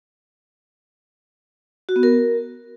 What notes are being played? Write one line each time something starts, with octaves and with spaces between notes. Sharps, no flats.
F#4
B3
A#4